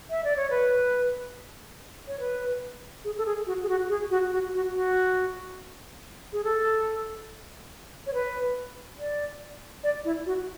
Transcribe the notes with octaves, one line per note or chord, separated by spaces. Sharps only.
E5
D5
C#5
B4
C#5
B4
G#4
A4
G#4
F#4
G#4
F#4
G#4
F#4
F#4
F#4
F#4
G#4
A4
C#5
B4
D5
D5
E4
F#4